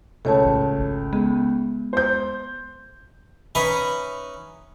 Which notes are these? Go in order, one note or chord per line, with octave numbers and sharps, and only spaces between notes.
C#2 A3 A4 C#5 A5
A1
G#1
G#3 B3
C5 G6
C#4 D#4 B4 E5 B5